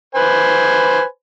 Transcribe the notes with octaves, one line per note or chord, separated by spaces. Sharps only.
B4 C5 G#5